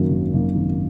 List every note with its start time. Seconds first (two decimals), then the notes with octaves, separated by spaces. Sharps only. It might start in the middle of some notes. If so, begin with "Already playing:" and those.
Already playing: F#2 D#3 F#3 A#3
0.11 G#1
0.34 F#2 D#3 F#3 A#3
0.56 G#1